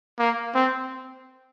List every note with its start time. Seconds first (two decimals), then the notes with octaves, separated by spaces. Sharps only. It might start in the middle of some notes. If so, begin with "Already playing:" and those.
0.19 A#3
0.55 C4